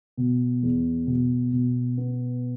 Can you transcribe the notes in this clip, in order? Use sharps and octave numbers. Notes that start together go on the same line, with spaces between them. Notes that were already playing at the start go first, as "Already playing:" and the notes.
B2
E2
B2
B2
B3